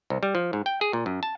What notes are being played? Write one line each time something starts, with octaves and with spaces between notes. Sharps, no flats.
C2
G3
F3
G#2
G5
G#4
A#2
F#2
A5